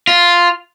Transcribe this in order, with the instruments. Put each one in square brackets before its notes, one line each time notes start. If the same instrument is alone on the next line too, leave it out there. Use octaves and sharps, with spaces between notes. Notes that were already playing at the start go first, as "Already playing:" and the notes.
[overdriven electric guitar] F4